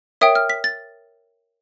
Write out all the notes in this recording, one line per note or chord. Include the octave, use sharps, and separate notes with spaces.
A#4 C#5 E5 G5 D#6
F6
B6
A6